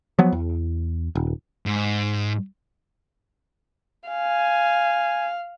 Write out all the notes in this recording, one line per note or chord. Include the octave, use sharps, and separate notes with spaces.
F3 F#3 B3
E2
D#1
G#2
F5 G#5